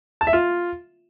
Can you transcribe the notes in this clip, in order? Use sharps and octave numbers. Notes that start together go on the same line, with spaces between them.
A5
E5
F4